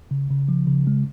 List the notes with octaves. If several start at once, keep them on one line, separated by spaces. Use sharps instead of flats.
C#3
C#3
F3
C#3
G#3